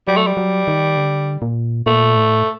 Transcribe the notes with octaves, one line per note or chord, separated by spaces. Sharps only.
F#3 G3
A3
G3
F#3
D#3
D3
A#2
A#2 A3
A2